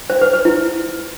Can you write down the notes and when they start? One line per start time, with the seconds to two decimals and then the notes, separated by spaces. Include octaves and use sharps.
0.10 C5
0.21 B4
0.33 B4
0.45 E4